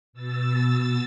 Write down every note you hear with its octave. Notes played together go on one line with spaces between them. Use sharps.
B2 E6 A6